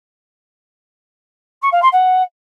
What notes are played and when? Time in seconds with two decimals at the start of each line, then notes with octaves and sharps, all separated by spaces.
1.62 C#6
1.72 F5
1.82 C6
1.92 F#5